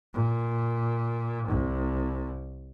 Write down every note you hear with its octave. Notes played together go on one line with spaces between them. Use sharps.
A#2
C2